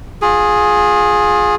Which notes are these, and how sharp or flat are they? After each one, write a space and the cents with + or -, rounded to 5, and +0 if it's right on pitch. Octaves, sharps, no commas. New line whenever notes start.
F4 +30 G#4 +0